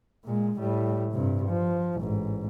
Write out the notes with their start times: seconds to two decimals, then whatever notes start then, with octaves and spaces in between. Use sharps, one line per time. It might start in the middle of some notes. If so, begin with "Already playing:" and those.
0.25 A#2 G#3
0.59 A2 G3
1.12 G2 C3
1.49 F3
1.97 A1 G#2